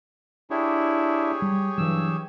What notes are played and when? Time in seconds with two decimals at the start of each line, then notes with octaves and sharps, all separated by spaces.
0.50 D4 E4 G4 G#4 C#5
1.42 G3
1.78 G2 E3 F#3 E6